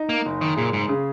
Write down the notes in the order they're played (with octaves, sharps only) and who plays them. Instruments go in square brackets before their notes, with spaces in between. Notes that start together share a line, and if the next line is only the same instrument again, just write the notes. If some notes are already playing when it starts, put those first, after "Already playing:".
Already playing: [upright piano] D#4
[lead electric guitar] A#3
[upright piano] F#1
[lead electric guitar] D#3
[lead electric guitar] A#2 [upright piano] G#4
[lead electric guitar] G#2
[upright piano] C#3